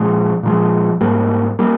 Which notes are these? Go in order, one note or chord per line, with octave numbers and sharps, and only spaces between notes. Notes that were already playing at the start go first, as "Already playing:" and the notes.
Already playing: A#2 F3 G#3
A#2 F3 G#3
G#2 G3 A#3
G3 A#3